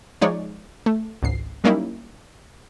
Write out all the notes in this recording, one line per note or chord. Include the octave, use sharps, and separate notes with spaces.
F3 G#3 D#4 C#5 D5
A3
G#1 C#2 G#2 C7
F#3 G3 A#3 C#4 D#4 E4